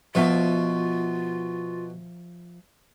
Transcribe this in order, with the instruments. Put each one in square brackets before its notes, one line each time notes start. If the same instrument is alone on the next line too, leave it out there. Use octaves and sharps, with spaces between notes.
[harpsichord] B2 [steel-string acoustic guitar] F3 E5 F5 [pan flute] F4